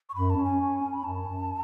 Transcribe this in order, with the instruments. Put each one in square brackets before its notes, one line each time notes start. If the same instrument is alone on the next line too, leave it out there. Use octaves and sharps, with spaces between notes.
[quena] C#6
[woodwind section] F#2 [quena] B5
[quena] A5
[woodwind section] C#4
[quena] G#5
[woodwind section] C#4
C#4
[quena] B5
[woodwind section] F#2 [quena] A5
[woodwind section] F#2